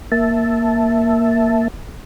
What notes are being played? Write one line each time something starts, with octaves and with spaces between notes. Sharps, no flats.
A#3 E5 A5